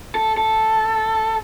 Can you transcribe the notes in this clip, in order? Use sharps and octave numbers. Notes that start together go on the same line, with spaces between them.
A4
A4